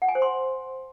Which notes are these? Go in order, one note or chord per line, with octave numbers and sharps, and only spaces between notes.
F#5
G#5
C5
C6